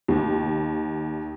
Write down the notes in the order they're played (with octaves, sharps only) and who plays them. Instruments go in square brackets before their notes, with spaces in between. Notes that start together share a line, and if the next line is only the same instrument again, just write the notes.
[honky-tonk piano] D#2